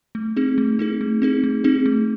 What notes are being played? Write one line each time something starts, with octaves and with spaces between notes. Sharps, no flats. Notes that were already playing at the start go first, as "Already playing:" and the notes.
A3
C4 D#4 G#4
A3
C4 D#4 G#4
A3
C4 D#4 G#4
A3
C4 D#4 G#4
A3